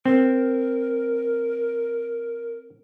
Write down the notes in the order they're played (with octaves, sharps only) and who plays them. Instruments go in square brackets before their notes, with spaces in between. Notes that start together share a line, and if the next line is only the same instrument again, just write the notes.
[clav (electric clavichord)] C4 [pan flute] A#4